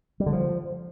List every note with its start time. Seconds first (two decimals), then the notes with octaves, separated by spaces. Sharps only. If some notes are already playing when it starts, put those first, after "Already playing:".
0.20 G3
0.26 D3
0.33 F3